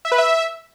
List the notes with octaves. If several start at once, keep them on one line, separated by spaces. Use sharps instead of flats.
E5
B4
E5